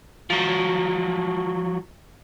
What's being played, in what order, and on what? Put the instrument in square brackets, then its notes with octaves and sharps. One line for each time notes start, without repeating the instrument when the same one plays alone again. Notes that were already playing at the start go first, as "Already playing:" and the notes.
[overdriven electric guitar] F3 F#3